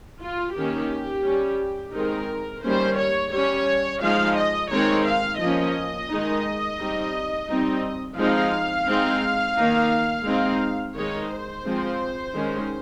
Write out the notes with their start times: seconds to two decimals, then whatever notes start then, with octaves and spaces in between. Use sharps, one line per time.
0.20 F4
0.55 D#3 A#3 C#4 G4
1.25 G3 C#4
1.94 D#3 G#3 C4 D#4 A#4
2.63 D#3 G3 A#3 C#4 C5
2.98 C#5
3.32 G3 C#4 C#5
4.02 F3 G#3 D#4 F5
4.37 D#5
4.71 D#3 G#3 C4 D#4 C#5
5.06 F5
5.41 F3 A#3 C#4 D#5
6.10 D#3 G#3 D#4
6.79 G3 C4 D#4
7.49 G3 C4 D#4
8.18 F3 G#3 C4 D#4 F5
8.87 G#3 C4 D#4
9.57 D#3 A#3 D#4
10.26 G#3 C4 D#4
10.96 D#3 G#3 D#4 C#5
11.30 C5
11.65 F3 G#3 C4
12.34 D#3 G#3 C#4